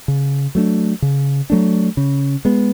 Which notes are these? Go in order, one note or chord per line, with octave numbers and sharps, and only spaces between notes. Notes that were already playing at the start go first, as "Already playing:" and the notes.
C#3
F#3 A3 D4
C#3
F#3 A3 D4
C#3
G#3 B3